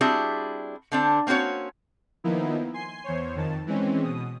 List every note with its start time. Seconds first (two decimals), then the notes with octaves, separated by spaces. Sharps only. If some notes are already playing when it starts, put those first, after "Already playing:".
0.01 G3 C4 D4 E4 F#4 G#4
0.92 D3 C4 D4
1.27 A#3 C4 C#4 F#4 C#5
2.24 D#3 F3 A#3 B3 D#4 E4
2.74 G#5 C6 C7
3.04 E2 C5 C#5
3.35 F2 D#3 A5
3.66 E3 G#3 C4 C#4
4.02 B2 D#6